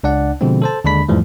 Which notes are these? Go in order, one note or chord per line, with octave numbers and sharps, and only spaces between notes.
C#2 D4 D5 F#5
B2 D3 F3 G#3 C4
A4 C5 A5
D#2 D3 G#3 D4 B5 B6
E2 G#2 E3 F3 G3 A3